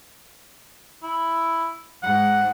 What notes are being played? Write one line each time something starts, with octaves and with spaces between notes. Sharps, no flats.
E4
G#2 F#5